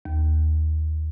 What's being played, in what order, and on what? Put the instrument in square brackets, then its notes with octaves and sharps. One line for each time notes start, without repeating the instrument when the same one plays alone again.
[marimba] D#2